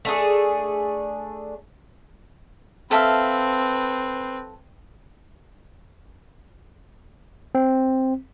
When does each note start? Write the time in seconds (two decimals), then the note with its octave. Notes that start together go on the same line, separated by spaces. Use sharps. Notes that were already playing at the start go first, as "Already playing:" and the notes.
0.05 A3 D4 G#4
2.91 C4 A4 B4 E5 F5
7.55 C4